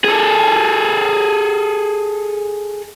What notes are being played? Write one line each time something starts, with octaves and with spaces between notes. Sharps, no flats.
G#4 A4